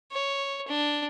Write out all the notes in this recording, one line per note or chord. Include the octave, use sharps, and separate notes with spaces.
C#5
D4